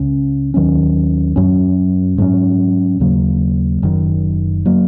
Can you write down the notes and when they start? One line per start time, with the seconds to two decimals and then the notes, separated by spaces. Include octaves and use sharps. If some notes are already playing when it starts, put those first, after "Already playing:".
Already playing: C#2 C#3 C#4
0.54 D#2 D#3 F#3 C#4
1.36 F#2 F#3 C#4
2.18 G#2 F#3 C#4
3.00 D#2 C#3 F#3 A#3
3.82 F#1 F#2 D#3
4.66 F#3 A#3